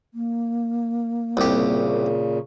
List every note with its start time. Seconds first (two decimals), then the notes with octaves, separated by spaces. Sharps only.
0.14 A#3
1.37 C2 A#2 C#3 G4